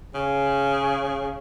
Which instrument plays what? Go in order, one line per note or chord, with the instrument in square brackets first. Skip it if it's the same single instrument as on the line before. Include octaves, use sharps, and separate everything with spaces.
[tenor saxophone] C#3 [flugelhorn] G#4